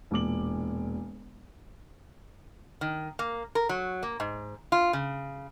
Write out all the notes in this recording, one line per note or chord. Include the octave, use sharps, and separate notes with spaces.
E1 A#2 D6 F#7
D#3
A#3
A#4
F#3
A#3
G#2
F4
C#3